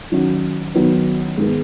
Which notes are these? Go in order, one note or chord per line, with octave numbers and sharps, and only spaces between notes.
D#3 F#3 C#4 F#4
D#3 F#3 B3
G#2 D#3 G#3 B3